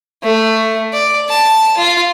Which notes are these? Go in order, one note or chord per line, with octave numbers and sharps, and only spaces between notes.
A3
D5
A5
F4